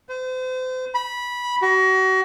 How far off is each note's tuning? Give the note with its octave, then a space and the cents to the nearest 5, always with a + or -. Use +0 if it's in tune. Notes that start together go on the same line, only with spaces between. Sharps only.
C5 -35
B5 -15
F#4 +35